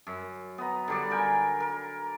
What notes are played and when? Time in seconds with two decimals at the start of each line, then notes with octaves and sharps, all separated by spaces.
0.07 F#2
0.58 B3 A#5
0.88 D3 G3 D5
1.11 A#4 G5 G#5
1.60 A#4